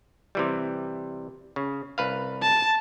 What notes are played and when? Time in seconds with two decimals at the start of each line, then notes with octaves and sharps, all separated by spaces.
0.35 C3 E3 G3
1.56 C#3
1.98 C2 B4 F5
2.42 A5